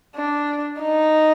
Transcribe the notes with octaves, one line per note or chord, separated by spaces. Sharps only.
D4
D#4